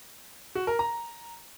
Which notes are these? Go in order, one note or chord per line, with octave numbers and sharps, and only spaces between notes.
F#4
A#4
A#5